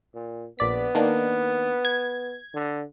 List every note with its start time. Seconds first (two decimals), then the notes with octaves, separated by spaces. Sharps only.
0.14 A#2
0.59 A#1 B3 D5 B6
0.95 D#3 A#3 D4
1.85 G#6
2.54 D3